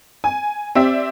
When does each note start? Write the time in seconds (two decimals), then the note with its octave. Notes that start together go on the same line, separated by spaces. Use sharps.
0.24 G#5
0.75 C4 G4 D5 E5